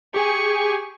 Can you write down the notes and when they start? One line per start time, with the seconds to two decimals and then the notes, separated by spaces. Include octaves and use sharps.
0.14 G4 G#4 G#5 C#6